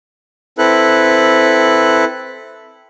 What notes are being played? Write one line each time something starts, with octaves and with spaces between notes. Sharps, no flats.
C4 E4 A4 B4 F#6